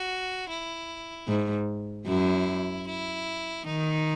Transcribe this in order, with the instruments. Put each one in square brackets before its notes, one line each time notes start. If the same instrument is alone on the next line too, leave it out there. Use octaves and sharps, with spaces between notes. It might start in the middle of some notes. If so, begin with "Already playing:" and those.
Already playing: [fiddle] F#4
E4
[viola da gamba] G#2
[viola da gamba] F#2 [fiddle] E4
[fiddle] E4
[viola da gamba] D#3 [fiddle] D#4